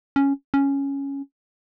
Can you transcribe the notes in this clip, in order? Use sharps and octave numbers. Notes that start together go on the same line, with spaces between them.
C#4
C#4